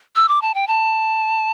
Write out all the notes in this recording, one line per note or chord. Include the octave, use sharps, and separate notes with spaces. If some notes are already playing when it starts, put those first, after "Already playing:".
E6
D6
A5
G5
A5